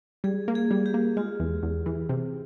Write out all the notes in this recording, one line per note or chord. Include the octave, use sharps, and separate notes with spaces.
G3 G#4
A#3
G#4
G3
G4
A#3
G#3 F4
E2
E2
E3
C3